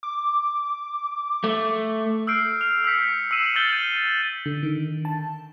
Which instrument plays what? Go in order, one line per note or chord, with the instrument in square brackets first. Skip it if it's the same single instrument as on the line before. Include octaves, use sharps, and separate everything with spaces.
[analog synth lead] D6
[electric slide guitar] A3
[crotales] E6 F6 G6 C7 D7
F6 F7
E6 G6 B6 C#7
E6 C7 C#7 D#7 E7 F#7
E6 F6 G6 A6 F#7 G7
D#7
[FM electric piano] D3
D#3
A5